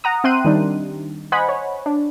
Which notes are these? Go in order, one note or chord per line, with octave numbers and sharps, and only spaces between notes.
F#5 A#5 D#6
C4 E5 G5 C6 F#6 D#7
D#3 G3 D4 D#4
C5 D#5 F#5 G#5 B5
C#5
D4